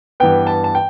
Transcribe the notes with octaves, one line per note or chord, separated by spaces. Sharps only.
G2 E3 B3 G5
A5
A5
G5